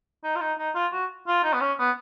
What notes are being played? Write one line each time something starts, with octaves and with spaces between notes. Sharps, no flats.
D#4
F4
D#4
D#4
F4
F#4
F4
D#4
B3
C#4
B3